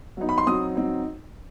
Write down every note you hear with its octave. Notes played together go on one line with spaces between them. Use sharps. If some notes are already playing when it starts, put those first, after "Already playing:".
F#3 B3 D#4
B5
C6
F#3 C4 D#4 D#6
F#3 C4 D#4